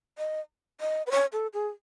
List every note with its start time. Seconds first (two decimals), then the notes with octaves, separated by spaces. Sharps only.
0.18 D#5
0.80 D#5
1.07 B4
1.11 C#5
1.33 A4
1.53 G#4